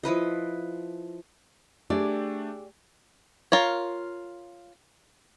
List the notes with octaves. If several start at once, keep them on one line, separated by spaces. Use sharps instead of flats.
F3 E4 B4 D#5
A3 D4 G4 G#4 D5
F4 A#4 C#5